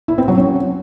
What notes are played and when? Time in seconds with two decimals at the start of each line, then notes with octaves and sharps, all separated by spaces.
0.08 E4
0.18 C4
0.28 F#3
0.38 C#4